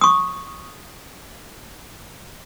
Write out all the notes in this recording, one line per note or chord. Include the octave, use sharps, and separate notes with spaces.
C#6 D#6